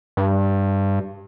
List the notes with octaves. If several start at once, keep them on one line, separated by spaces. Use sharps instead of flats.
G2